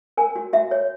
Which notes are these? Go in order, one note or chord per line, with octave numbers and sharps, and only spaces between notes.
A#4 G#5
F#4
F#4 E5
C#5